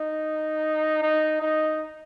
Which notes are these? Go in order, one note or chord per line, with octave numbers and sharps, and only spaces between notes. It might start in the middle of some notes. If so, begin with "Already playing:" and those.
Already playing: D#4
D#4
D#4